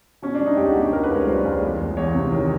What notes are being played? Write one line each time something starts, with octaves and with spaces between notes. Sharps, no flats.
B2 C#4
D4
G3
D#4
C#2 G4
F#4
B2
G4
C#2 A#4
B4
C#2 C#5
G3 C5
C#2
E2
E2
E2 C#5
C3
D#3